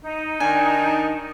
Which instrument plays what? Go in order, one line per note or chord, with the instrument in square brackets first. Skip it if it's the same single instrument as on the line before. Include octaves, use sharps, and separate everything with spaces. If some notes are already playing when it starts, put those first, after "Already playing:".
[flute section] D#4
[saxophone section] D#3 D4 [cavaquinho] G#5